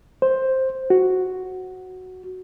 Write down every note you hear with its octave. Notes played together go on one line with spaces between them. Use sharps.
C5
F#4